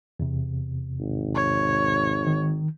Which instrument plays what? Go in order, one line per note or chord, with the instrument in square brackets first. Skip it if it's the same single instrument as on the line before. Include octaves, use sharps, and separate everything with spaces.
[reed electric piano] E2 C3
[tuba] G#1
[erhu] C#5
[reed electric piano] D#3